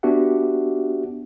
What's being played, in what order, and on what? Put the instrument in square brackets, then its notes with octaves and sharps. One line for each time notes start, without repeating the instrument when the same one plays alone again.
[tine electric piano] B3 D4 F#4 G4 E5 F#5